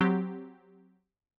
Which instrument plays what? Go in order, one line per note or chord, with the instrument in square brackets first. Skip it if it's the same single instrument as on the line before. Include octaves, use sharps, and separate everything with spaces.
[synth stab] F#3 C4 G4